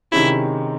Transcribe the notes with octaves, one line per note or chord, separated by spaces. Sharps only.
C3 D#3 G#3 C#4 E4